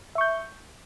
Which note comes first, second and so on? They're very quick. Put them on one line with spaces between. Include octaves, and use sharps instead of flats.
E5 C#6 G6